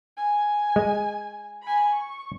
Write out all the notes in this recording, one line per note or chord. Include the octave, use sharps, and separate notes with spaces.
G#5
G#3
G#5 B5
C#6